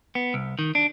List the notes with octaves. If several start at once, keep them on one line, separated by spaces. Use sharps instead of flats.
B3
C2
D#3
D4